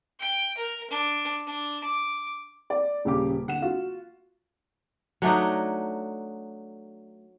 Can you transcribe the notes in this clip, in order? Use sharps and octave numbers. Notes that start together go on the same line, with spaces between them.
G5
A#4
D4
D4
D6
D5
D#1 C#3 G4 D6
D3 F#5 E7
F4 F#4
F#3 A3 D4 D#4